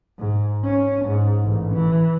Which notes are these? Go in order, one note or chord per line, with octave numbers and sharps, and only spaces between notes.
G#2
C#4
G#2
A1
E3